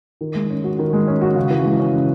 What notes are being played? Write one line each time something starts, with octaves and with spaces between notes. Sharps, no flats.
D#3
G#3
C#4
F#4
D#3
G#3
C#4
F#4
C#3
E3
G#3
C#4
C#3